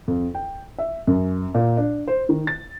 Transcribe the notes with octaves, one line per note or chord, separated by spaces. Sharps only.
F2
G5
E5
F#2
A#2
D4
C5
D#3
A6